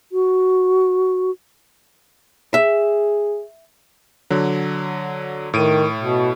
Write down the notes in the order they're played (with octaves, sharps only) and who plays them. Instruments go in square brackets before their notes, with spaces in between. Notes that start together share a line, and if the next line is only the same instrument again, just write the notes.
[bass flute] F#4
[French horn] G#4 [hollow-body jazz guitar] E5
[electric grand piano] D3 F#3
[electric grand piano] A2 D7 D#7 [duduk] D#3
[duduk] B2